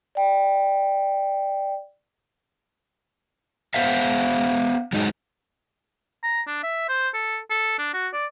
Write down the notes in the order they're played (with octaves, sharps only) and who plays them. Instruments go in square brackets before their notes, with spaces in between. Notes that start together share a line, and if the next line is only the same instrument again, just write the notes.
[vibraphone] D5 G5
[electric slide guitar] B3 C5 E5 F5
F#3 G#3 D#4 D#5
[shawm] A#5
D4
E5
C5
A4
A4
D4
F#4
D5